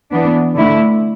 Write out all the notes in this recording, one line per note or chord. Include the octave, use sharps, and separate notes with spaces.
E3 B3 D4
D3 A3 E4